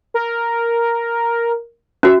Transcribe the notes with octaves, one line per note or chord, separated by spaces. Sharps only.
A#4
C#4 F#4 E5